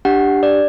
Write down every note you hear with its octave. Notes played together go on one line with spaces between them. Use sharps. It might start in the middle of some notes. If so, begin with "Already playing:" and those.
D4 G4 F#5
D5